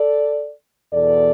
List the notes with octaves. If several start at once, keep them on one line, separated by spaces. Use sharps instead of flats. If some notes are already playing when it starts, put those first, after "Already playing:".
Already playing: A4 D5
E2 B2 A4 D5